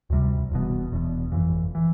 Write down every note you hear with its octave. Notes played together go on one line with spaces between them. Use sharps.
D2 C3 G3
E1 E2 B2
E1 E2 B2
G1 F2 E3
E3